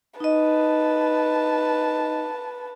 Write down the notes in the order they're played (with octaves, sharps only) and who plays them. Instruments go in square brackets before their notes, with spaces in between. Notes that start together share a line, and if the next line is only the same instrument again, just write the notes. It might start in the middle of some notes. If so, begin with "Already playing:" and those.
[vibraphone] D#4 D#5 [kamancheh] B4 A5